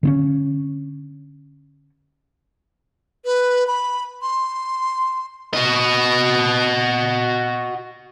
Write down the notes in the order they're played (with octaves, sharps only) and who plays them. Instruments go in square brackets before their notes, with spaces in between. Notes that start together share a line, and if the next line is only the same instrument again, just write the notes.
[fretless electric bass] D3 C4 C#4
[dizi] B4
B5
C6
[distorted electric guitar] F#4 D#5